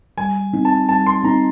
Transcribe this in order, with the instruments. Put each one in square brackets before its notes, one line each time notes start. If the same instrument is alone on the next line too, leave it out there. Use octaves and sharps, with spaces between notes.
[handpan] G3 [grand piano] G#5
[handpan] C4 D#4
[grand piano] A5
[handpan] G3 [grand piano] A5
[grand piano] C6
[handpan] C4 D#4 [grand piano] A#5